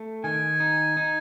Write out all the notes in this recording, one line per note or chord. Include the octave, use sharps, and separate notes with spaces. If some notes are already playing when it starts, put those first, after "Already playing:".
Already playing: A3
D#3 G#5
D#4
D#4